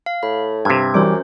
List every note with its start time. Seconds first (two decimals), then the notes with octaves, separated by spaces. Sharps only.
0.06 F5
0.23 A2 B5
0.65 G2 C3 G#6
0.94 F#2 E3 G3 C#4 C5 D6